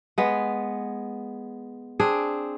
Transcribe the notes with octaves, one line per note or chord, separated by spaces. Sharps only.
G#3 B3
C4 D4 G#4